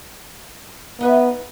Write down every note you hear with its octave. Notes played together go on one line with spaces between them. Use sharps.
B3 D#4 B4 E5